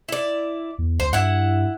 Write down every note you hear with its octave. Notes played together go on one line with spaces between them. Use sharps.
E4 D5
E2
D2 C5
G2 E4 F#5